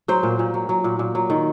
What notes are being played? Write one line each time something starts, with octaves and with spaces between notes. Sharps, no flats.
F#3 C5
A#2
A#2
F#3
F#3
A#2
A#2
F#3
D#3